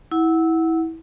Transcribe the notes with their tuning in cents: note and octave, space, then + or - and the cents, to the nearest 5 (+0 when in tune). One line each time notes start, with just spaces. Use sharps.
E4 -20 F#5 +0